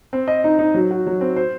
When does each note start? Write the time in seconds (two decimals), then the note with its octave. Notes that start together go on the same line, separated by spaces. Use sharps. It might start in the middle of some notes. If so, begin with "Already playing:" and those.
0.13 C4
0.28 D#5
0.44 D#4
0.59 D#4
0.74 F#3
0.91 F#4
1.06 F#3
1.21 C4
1.36 C5